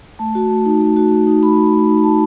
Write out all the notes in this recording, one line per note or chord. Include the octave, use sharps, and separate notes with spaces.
A3 A5
F#4
A3
D#4
A3
F#4
A3
D#4
A3 B5
F#4
A3
D#4
A3 A5